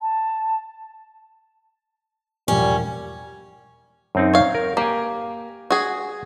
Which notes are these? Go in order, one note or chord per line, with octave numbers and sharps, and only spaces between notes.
A5
E1 F3 G3 C#4
F#2 C4 D#4
C#5 F5
A#4
A#3 G4 G#5
F#4 G#4